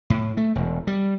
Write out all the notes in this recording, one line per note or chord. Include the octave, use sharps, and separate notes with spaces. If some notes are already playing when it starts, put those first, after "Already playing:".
A2
A3
E1
G3